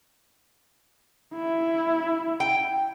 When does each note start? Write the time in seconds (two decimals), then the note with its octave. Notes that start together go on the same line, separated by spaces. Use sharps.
1.34 E4
2.40 G5